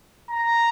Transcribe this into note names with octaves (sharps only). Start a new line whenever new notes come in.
A#5